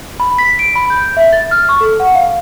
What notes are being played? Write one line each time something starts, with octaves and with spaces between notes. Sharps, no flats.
B5
B6
D7
B5
G6
E5
A6
F6
C#6
A4
F#5
F5